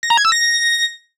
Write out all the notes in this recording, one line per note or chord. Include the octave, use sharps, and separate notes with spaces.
A#6
A#5
G#6
E6
A#6